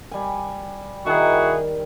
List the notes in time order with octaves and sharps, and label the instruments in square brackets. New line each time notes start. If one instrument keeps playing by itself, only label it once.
[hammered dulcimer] G3 G#5
[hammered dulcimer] D#3 [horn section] E4 F#4 G#4